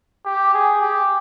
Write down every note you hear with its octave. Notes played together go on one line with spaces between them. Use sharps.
G4
G#4
G4